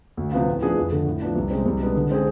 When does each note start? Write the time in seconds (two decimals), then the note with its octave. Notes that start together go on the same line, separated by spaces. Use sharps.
0.17 D2
0.32 C3 F3 B3 F4
0.47 A2
0.62 F3 B3 D4 G#4
0.77 F2
0.92 D3 A3
1.06 A2
1.21 F3 B3 D4
1.35 C2
1.50 C3 G#3 C4
1.66 C2
1.80 B2 G#3 B3 D4
1.96 D3
2.10 G#3 C4 G#4